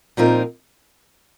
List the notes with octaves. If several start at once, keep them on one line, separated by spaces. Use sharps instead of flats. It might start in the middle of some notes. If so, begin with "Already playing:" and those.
A#2 F3 C4 D#4 A#4